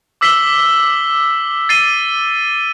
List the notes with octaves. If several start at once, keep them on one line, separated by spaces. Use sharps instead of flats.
D6 E6 B6 C7 F#7 G7
A6 C7 D#7 G7